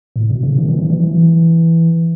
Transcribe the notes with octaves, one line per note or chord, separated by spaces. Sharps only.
A2
B2
C#3
D#3
E3
E3
E3
E3